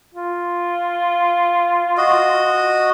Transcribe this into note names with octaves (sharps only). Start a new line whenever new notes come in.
F4
F#4 D#5